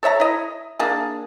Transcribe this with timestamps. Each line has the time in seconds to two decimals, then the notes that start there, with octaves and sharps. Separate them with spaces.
0.03 A4 C#5 E5 A#5
0.20 E4 D#5
0.79 A#3 D4 G#4